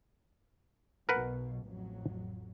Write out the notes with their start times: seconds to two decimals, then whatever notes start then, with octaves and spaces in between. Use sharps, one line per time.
1.09 B1 B2 A#4 B4 F#5
1.64 A1 F2 F#3